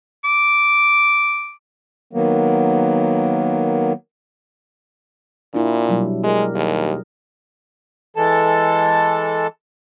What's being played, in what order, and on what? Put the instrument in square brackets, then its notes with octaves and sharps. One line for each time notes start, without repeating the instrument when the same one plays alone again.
[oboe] D6
[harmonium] D#3 F#3 A#3 B3
[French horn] A#2 [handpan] D4 E4
[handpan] B2 F#3 G3
[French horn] G#3 [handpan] G4 A#4
[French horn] D#2 [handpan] G#4
[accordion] E3 G#3 A4 A5